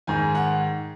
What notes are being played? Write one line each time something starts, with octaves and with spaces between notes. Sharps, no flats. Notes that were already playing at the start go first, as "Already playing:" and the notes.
G#2 D#3 G#5
F#5